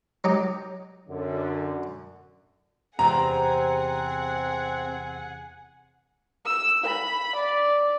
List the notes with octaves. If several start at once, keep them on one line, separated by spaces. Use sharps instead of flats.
F#3 D#4 G4
F#2 D3
E2 C3 C4 G#4 F#5 A#5
E6
B5
D5